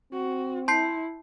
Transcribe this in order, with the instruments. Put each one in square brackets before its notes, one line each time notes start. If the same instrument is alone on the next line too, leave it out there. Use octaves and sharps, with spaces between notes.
[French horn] C4 [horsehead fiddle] F#4
[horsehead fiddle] E4 [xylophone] A5 G6 [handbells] C6 C7